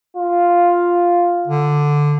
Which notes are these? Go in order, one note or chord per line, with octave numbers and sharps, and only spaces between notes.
F4
D3